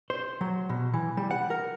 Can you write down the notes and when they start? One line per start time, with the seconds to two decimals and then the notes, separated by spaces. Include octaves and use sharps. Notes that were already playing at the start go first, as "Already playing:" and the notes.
0.10 C5
0.41 F#3
0.69 B2
0.94 E3
1.17 G3
1.31 F#5
1.50 A#4